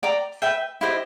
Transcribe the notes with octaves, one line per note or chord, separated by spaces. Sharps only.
D5 G5 A#5 D6
B4 E5 G5
E4 G4 C5 D#5